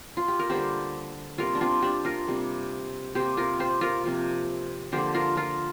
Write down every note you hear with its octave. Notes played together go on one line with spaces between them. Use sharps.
F4
G4
A#4
D3 G3 A#3 G4 C5
C3 G3 A#3 F4 A#4
D4
C4 F4
D4 G4
F4 A#4
C3 G3 A#3
C3 A#3 G4 C5
F4 A#4
G4 C5
F4 A#4
C3 F3 A#3
D3 F3 A#3 G4 C5
F4 A#4
F4 A#4